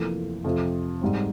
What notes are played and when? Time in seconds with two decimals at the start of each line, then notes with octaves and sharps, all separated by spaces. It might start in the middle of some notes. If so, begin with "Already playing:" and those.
Already playing: F1 F2 E3 A#3 F4
0.44 F2 C3 F3 C4 F4
1.01 G#2 G3 C4